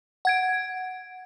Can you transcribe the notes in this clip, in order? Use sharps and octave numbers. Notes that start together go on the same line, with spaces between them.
F#5 G#6 D7